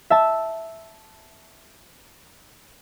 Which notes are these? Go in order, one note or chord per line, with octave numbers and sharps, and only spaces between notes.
E5 A5